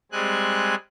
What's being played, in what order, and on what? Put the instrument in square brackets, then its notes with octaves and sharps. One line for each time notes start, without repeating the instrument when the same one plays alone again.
[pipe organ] G3 G#3 C4 G#5 F#6